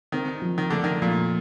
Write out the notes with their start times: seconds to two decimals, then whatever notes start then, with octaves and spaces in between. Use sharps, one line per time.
0.12 D#3 C4
0.42 F3
0.58 D#3
0.70 D3 A3
0.84 D#3
1.02 A#2 F3